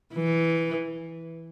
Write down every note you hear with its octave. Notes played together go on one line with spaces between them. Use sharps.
E3